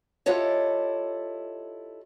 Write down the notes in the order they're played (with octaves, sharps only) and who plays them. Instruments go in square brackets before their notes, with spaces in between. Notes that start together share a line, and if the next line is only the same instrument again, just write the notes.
[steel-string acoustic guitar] E4 F4 G4 A4 C#5 D#5